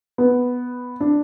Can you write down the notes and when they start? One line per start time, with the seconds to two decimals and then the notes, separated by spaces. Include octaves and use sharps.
0.18 B3
1.01 D4